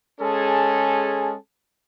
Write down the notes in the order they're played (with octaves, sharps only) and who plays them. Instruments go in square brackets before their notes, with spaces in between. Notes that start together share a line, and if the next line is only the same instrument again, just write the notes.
[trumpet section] G#3 C#4 G#4 A4 A5